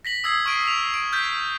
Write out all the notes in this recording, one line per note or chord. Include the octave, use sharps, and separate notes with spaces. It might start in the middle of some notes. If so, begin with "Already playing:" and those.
A#6 B6 F#7
D#6 E6 G#6 C7 F#7
C#6 F6 D7 D#7
B6 F7
D7
F6 G6 A6 B6